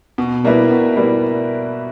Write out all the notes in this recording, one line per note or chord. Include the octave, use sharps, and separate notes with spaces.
B2
G3 A#3 E4 B4
B2
G3 A#3 E4 B4